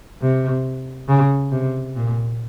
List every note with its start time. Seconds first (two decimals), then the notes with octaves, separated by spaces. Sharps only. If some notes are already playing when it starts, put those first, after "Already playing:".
0.22 C3
1.09 C#3
1.51 C3
1.96 A#2